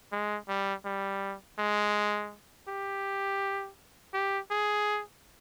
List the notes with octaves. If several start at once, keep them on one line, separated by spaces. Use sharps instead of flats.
G#3
G3
G3
G#3
G4
G4
G#4